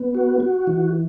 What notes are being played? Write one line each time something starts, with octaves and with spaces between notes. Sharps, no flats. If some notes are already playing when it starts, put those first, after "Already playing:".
Already playing: B3
F#4
F#4
E3